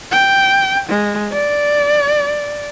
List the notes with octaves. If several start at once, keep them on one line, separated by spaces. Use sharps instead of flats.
G5
G#3
D5